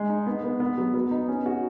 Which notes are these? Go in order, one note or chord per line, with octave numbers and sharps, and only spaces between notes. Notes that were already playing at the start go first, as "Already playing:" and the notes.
Already playing: G#3
D#4
B3
B3
B3
F#3
B3
D#4
C#4
F#4